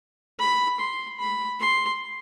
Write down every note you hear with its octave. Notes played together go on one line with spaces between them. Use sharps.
B5
C6
B5
C6